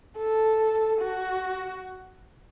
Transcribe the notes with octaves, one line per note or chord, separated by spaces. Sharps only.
A4
F#4